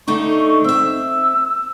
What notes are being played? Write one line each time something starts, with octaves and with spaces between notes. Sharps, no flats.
D3 A3 D#4 C#6
C4 E5 E6